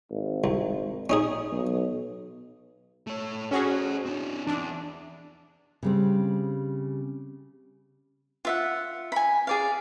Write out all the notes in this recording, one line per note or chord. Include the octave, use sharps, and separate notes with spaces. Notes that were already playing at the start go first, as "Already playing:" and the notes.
G#1
C2
C#4 D#4 G#4
B1
A3 C#5
C#4 F#4 G#4 A4 C5
C4 D4
E2 D4
C#3 G3 C4
F4 E5 F#5
G#5 B5
G#4 D5 F5